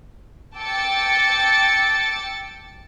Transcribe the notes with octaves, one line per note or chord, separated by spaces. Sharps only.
G5 A5 D6 E6 A6 C#7